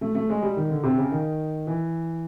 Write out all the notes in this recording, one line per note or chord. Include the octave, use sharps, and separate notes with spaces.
A3
A3
G#3
G3
D#3
D3
C3
C#3
D#3
E3